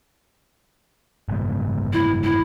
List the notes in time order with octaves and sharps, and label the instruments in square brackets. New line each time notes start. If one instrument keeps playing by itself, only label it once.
[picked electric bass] F#1 G#2 B2
[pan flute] E4
E4